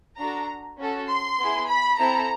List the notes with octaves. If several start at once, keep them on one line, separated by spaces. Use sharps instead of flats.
D4 F#4 A4 A#5
C#4 F#4 A4
C6
B3 E4 G#4
B5
C4 E4 A4 A#5